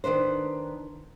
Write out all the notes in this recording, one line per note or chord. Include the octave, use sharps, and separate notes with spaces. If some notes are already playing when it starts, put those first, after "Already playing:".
D#3 D4 B4 C5